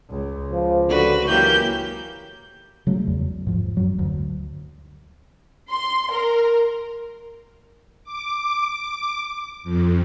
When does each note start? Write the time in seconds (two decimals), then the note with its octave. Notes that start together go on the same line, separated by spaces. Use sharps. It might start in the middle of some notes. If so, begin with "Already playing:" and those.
0.10 C#2
0.53 F3
0.89 D3 F#4 B4
1.28 E3 F#3 A#3 G4 G6
2.87 C#3 F#3 A3
3.07 E2
3.47 G#2 F3
3.77 F#2 F#3
3.99 D2
5.70 C6
6.12 A#4
8.04 D6
9.64 F2